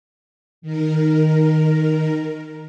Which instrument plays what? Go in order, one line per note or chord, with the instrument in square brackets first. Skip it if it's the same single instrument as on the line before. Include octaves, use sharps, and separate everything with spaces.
[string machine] D#3 A#4